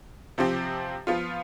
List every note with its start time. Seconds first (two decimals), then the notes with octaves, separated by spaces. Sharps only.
0.38 C3 F3 C4 G4
1.07 F3 B3 F4